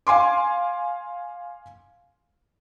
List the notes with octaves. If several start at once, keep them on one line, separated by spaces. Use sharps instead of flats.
F5 G#5 C6 D6